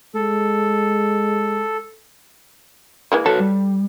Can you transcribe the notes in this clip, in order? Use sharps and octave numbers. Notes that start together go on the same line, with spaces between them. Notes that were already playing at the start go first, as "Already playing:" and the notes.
G#3 A4
E3 G#3 A#3
F#4 A4 B4 C#5
G3